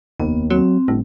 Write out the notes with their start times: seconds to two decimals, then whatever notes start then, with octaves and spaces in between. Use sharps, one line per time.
0.20 F1 D#2 B3
0.50 F#3 C4
0.88 G1 A2